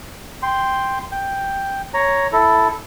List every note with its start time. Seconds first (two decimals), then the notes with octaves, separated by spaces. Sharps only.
0.43 G5 C6
1.12 G5
1.94 C#5 A#5
2.32 E4 A4